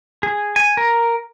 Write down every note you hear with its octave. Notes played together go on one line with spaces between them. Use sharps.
G#4
G#5
A#4